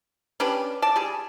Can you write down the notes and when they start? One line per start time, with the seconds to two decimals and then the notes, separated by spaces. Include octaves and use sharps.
0.40 C#4 D4 G4 B4
0.82 D5 A5
0.96 G3 G#4